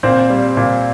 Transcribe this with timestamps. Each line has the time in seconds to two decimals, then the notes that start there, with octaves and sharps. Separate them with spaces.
0.03 A#2 C4 C5
0.30 G3
0.57 A#2